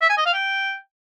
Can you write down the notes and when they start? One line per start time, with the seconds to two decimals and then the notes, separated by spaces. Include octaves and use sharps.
0.01 E5
0.09 G#5
0.17 D#5
0.25 F5
0.33 G5